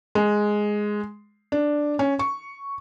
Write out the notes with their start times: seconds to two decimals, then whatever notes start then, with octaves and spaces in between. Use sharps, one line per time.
0.15 G#3
1.52 D4
1.99 C#4
2.19 C#6